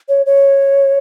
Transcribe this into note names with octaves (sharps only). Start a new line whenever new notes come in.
C#5
C#5